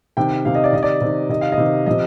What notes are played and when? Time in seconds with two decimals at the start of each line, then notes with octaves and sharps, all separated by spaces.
0.17 C3 D#3 G5
0.45 C3 D#3 F5
0.55 D#5
0.64 D5
0.73 C3 D#3 D#5
0.83 D5
1.01 C3 D#3
1.29 C3 D#3 D#5
1.41 F5
1.52 D#5
1.58 C3 D#3
1.86 C3 F3 D#5